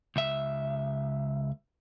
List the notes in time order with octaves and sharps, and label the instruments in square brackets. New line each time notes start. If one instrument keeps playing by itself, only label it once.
[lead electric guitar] C#2 E5